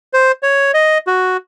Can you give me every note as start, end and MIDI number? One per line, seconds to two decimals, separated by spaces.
0.13 0.32 72
0.43 0.72 73
0.74 0.98 75
1.07 1.37 66